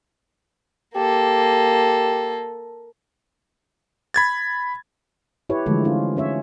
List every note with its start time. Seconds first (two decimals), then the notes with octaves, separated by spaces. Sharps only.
0.95 A#3 G4 A4
4.14 B5 G#6 A6
5.49 E4 G4 B4 C#5
5.66 D3 E3 F3 G#3 A3 A4
5.84 C#4 D#4 F4
6.17 C#4 C#5 E5